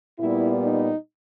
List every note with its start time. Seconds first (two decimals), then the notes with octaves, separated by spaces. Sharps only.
0.20 A#2 G3 B3 E4
0.65 D#4